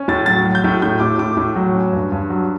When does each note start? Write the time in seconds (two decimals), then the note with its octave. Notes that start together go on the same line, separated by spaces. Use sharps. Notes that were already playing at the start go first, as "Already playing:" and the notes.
Already playing: C#4
0.08 A2 A6
0.26 F#3 A6
0.45 F#3
0.55 G6
0.64 A2
0.82 A2 G6
1.00 A2 D6
1.18 A2 D6
1.37 A2
1.56 F#3
1.75 C#4
1.93 G2
2.12 G2
2.30 F#3